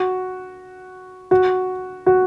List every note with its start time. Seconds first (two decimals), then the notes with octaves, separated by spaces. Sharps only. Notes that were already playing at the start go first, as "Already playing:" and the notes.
Already playing: F#4
1.31 F#4
2.06 F#4